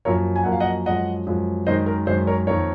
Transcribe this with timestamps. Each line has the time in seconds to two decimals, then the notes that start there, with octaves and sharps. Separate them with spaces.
0.05 F#2 F3 A#3 A#4 C#5
0.36 G#5
0.44 F#2 F3 A#3 F#5
0.52 F5
0.60 D#5 F#5
0.86 F#2 F3 G#3 D#5 F#5
1.27 F#2 F3 G#3
1.67 F#2 D#3 G#3 C5 D#5
1.86 A#4
2.07 F#2 D#3 G#3 C5
2.27 A#4 C#5
2.47 F2 D#3 A#3 A#4 C#5